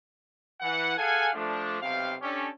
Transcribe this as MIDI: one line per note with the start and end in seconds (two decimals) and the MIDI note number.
0.61 0.96 52
0.61 0.96 78
0.97 1.29 68
0.97 1.29 69
0.97 1.29 77
0.97 1.29 78
0.97 1.29 80
1.34 1.80 53
1.34 1.80 57
1.34 1.80 62
1.81 2.15 35
1.81 2.15 48
1.81 2.15 77
1.81 2.15 79
2.22 2.48 61
2.22 2.48 62
2.22 2.48 67
2.22 2.48 69